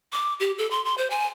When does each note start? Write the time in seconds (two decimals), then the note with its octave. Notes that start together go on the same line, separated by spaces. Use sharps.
0.13 D6
0.40 G4
0.58 A4
0.71 C6
0.85 C6
0.98 C5
1.10 G#5